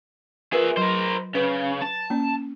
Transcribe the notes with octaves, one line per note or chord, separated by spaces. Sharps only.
F4 G#4 A#4 B4 E5
F#3 A#4 C5
C#3 B4
A5
A#3 C#4